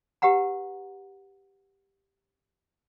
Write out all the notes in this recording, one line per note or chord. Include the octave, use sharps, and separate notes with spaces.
G4 B4 F#5 A#5